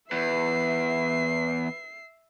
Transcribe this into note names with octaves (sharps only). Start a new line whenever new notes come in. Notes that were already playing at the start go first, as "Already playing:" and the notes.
E2 B4 E5 C7